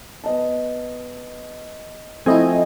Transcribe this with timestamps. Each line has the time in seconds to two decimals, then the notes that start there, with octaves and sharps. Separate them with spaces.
0.24 B3 D#5 A5
2.26 F3 A3 C4 E4 D#5 G#5